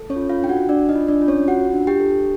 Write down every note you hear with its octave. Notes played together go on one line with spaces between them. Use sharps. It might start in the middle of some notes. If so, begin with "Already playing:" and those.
Already playing: A4
C#4 C#5
F4
F4 F5
D4 G5
F#4 F#5
D4 D5
D#4 D#5
F4
D4 D5
F4
C#4 C#5
F4 F#4 F#5
D4
G4 G5
A4